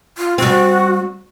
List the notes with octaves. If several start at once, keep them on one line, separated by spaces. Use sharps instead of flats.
F4
G3 C4 F#4